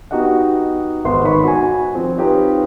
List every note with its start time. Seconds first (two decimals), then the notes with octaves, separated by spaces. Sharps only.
0.11 B3 D#4 F#4 G4 D#5 F#5
1.05 G#1 B3 C5 C6
1.24 G#2 D#3 B4 C#5 B5 C#6
1.44 F#4 G#5
1.95 F3 C4
2.18 C4 D#4 F4 G4 B4 C#5